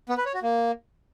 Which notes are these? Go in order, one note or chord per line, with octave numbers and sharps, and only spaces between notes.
B3
B4
C#5
F#4
A#3